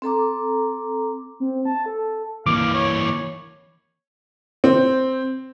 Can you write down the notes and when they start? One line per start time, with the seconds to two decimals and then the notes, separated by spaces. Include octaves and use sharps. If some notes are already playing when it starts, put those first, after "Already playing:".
0.02 C4 A4 A#5 D6
1.40 C4
1.65 A5
1.86 A4
2.46 E3 A#3 F5 D6
2.74 C#5
4.64 C4